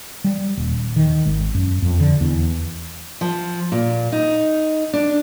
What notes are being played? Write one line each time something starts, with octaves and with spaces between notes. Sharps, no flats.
G3
D#1
D#3
G#1
F#2
F2
D3
E2
F3
A#2
D#4
D4